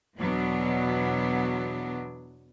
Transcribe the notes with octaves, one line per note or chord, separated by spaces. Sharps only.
E2 B2 F#3 B3 D4